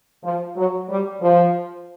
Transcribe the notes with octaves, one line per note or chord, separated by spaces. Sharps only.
F3
F#3
G3
F3